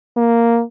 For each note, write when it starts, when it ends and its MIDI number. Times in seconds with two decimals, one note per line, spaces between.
0.17 0.62 58